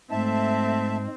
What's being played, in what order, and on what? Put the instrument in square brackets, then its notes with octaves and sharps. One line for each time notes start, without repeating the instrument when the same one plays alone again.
[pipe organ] G#2 G#3 [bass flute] A3 [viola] C4 [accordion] E5 A5